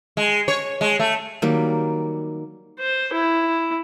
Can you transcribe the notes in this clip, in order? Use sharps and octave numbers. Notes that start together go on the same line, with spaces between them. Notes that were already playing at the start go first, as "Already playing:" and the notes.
G#3
C#5
G#3
A3
D#3 F#3 G3 A#3
C5
E4